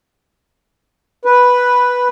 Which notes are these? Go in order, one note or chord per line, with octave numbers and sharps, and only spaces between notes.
B4